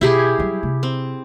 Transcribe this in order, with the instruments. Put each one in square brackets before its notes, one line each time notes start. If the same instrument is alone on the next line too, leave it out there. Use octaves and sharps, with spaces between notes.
[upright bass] B2 [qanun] E4 G4 G#4
[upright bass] F#3 G3
C3
[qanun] C4